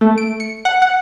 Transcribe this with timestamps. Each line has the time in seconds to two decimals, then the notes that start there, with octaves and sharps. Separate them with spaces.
0.01 A3
0.18 D7
0.40 C#7
0.65 F#5
0.82 F#5